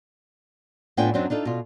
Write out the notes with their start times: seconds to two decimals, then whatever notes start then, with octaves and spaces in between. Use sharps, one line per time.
0.97 A2 B3 D4 F4 G5 G#5
1.14 F#2 F#3 C4 D4 D#4
1.30 D4 D#4 F4 A4
1.45 B2 F4